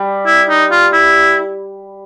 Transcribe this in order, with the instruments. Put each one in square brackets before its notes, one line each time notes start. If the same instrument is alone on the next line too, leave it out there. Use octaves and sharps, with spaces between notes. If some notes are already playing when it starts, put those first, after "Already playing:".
Already playing: [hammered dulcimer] G3
[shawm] E4
D#4
F4
E4